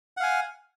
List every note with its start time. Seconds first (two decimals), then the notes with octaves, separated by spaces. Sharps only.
0.17 F#5
0.20 F5
0.23 G#5